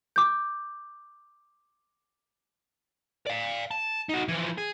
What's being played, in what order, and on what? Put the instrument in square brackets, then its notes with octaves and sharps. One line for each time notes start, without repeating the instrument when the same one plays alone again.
[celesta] D6 G6
[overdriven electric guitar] D5 F5
A5
D#4 F#4
E3 F3
G#4